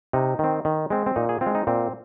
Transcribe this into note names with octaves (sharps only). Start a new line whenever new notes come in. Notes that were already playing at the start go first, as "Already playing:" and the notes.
C3 D#4
D#3 C4
D#3
G#3 C4
C4
A#2 D#4
G#4
C4 F4
G#3
D#4
A#2 C4